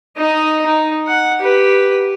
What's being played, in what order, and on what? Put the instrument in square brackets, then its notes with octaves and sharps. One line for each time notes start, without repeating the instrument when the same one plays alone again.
[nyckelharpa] D#4 D#5
D#4
F#5
G4 B4